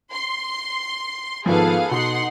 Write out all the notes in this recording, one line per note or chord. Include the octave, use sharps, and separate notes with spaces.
C6
G#1 F3 B3 G#4 A4 B4 F5
B2 D#4 F#5 C6